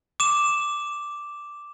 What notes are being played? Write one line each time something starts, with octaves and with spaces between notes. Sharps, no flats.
D6 E7